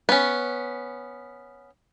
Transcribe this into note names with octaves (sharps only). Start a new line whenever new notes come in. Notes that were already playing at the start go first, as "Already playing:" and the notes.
B3 C#4